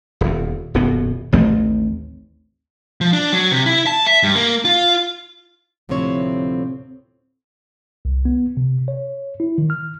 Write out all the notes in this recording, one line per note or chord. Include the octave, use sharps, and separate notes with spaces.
D#1 E2
D#1 F#2 B2 B3
A1 D#2 A3 C4
F3
D4
F#3
C3
E4
A5
E5
G2
A#3
F4
D2 A2 C3 F3 C4 C#5
C2
B3
C3
C#5
E4
D#3
F6